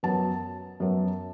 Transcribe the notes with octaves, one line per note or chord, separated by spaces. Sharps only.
F#2 F#3 B3 A5
F#2 F#3 B3